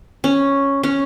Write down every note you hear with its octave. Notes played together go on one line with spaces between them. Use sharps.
C#4
C#4